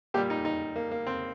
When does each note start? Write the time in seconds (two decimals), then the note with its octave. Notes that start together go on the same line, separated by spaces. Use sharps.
0.14 A#2 G4
0.17 G3
0.30 D#4
0.45 D#4
0.76 A#3
0.91 A#3
1.07 C4